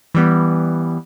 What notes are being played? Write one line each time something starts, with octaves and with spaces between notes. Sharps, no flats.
E3 G3 B3